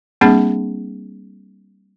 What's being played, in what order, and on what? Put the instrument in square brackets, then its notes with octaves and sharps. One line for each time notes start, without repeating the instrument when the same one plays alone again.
[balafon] G3 A#3 C4 D4 G#4